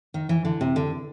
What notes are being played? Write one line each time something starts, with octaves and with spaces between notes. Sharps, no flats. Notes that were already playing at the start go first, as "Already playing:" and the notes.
D#3
E3
D3
C3
D3